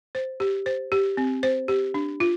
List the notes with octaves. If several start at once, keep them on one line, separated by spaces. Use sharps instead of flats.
C5
G4
C5
G4
C4
C5
G4
D4
F4